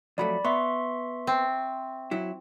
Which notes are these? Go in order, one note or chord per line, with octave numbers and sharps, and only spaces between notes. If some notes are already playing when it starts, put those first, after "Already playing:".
F2 F#3 A3 D5 B5
B3 E5 C6 C#6
C4
F#3 E4